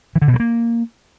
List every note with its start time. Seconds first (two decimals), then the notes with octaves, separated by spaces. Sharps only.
0.16 E3
0.22 D3
0.28 B2
0.34 F#3
0.40 A#3